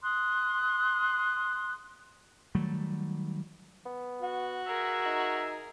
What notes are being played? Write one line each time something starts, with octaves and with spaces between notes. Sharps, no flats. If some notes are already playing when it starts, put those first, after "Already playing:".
C6 D#6 F#6
D#3 F#3 G3 A3
B3
F#4
G#4 A#4 E5
D#4